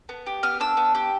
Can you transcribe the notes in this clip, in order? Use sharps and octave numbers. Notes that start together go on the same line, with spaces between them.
B3
G4
B3 F6
D4 E6
B3
G4